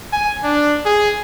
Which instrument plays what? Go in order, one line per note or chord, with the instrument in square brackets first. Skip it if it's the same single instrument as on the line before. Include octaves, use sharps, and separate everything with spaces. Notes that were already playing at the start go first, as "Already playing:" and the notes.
[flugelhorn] G#5
D4
G#4